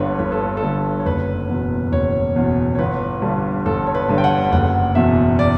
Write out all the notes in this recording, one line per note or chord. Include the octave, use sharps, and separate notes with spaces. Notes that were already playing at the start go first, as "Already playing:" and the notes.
Already playing: G1 G2 D3 B4 C#5
G1 B4
A4
A4
G2 D3
C#5
F#1 B4
E2 B2
F#1 C#5
E2 B2
C#5
G1 B4
G2 D3
G1 A4
C#5
B4
G2 D3
G5
F#5
F#1 F#5
E2 B2 E5
D5